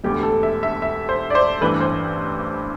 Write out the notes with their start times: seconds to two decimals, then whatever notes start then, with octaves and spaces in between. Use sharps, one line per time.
0.04 E1 D2 D3 G4
0.23 A4
0.43 E5
0.63 E5
0.82 E5
1.09 C5
1.30 D5
1.35 C5
1.61 A1 G2 E3 B4
1.81 C5